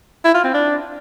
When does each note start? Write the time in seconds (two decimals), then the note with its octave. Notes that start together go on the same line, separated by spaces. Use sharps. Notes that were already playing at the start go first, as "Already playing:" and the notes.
0.24 E4
0.34 F4
0.44 C4
0.54 D4